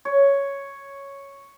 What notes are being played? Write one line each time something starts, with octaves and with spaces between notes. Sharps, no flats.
C#5